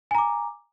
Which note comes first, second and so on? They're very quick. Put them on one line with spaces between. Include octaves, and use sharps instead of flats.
G#5 A#5 D6